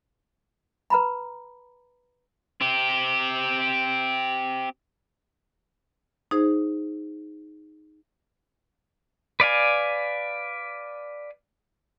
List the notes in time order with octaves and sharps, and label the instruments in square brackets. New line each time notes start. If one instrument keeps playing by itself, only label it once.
[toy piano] B4 A#5 B5
[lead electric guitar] C4 G4
[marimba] D#4 G#4 C5
[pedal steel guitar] B4 D5 F5 G#5